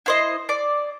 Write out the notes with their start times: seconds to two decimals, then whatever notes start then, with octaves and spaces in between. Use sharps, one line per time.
0.06 E4 C5 D#5
0.49 D5 D6